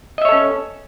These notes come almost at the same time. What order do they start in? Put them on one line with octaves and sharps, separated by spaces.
D#5 E5 C#5 A4 C#4